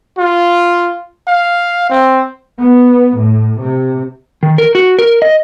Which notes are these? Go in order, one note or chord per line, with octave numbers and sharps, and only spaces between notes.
F4
F5
C4
B3
A2
C3
D#3
A#4
F#4
A#4
D#5